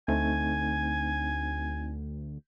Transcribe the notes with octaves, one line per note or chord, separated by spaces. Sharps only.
D2 A3 C4 D#4 G#5